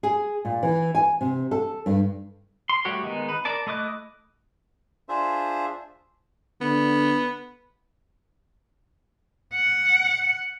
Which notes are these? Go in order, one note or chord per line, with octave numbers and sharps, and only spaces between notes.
G#4
A#2
E3
G#5
C3
A4
G2
C6
G3 A3 F#4 G4 C#5
D#3 G#3 B3 D#4
B4
A#4 D5 A5
A3 E4 D#5 D6 F#6
D4 F4 G#4 C5 E5
D3 B3
F#5